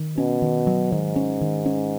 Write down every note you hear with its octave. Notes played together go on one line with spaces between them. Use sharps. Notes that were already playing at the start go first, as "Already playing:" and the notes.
Already playing: D#3
B2 C#4
D#3
F#3
G#2 D#3
C#4
D#3
C#4